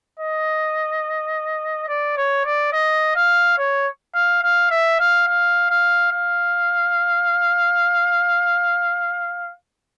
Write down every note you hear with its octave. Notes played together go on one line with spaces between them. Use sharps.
D#5
D5
C#5
D5
D#5
F5
C#5
F5
F5
E5
F5
F5
F5
F5